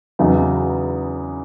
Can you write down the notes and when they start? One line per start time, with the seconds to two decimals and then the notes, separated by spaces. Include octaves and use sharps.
0.19 E2 C#3 F#3 B3 D#4